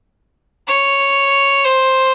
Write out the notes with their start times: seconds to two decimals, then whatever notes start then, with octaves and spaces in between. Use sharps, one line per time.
0.68 C#5
1.65 C5